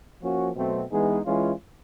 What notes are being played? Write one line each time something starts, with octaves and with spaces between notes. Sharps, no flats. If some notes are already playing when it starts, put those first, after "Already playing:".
F3 A#3 C#4 F#4
B2 F#3 A3 C4
E3 G#3 B3 D#4 G#4
E3 G#3 C#4 F4